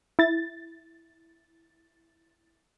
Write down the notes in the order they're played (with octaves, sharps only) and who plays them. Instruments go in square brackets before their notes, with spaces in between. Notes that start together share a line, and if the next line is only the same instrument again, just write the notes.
[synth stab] E4 A6